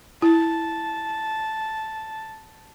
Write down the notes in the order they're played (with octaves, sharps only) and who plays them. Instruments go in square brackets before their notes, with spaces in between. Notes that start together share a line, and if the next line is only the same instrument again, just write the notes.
[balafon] E4 [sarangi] A5